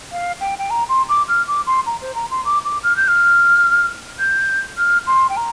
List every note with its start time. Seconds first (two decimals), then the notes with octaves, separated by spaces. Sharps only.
0.12 F5
0.41 G5
0.59 G5
0.70 A#5
0.89 C6
1.09 D6
1.28 F6
1.47 D6
1.67 C6
1.86 A#5
2.02 C5
2.15 A#5
2.31 C6
2.45 D6
2.65 D6
2.83 F6
2.97 G6
3.08 F6
4.19 G6
4.78 F6
5.07 C6
5.29 G5
5.37 A#5